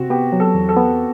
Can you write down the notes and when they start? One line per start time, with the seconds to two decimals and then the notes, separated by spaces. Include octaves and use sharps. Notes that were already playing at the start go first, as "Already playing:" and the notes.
Already playing: C3 C4 F#4
0.10 B3 G4
0.33 F#3
0.40 A4
0.54 E2
0.69 A4
0.77 B3